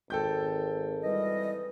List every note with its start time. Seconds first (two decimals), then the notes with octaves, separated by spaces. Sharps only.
0.10 G#1 A4 G5 G6
1.03 E3 G3 D#5